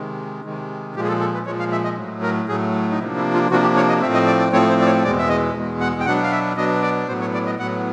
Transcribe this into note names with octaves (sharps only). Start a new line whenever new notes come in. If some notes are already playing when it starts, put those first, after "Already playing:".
Already playing: C3 D#3 G#3
C3 D#3 G#3
A#2 F3 G#3 G4
G#4
A4
A4
B4
A#2 F3 G#3 C#5
F5
E5
D#5
A2 F#3 A3
A#4
A2 F#3 A3 G#4
D#4
C3 F3 A#3 D4 E4
E4
F4
C3 F3 A#3 D4 F#4
G4
C#5
D#5
A2 F3 A3 C4 E5
D#5
D5
D5
A2 F3 A3 C4 C#5
C5
D5
C#5
E2 B2 G#3 D5
E5
D#5
E2 B2 G#3
F#5
G5
B2 F#3 B3 D4 F#5
F5
E5
B2 F#3 B3 D4 D#5
D5
A2 F#3 B3 C5
C#5
D5
D#5
A2 F#3 B3 F#5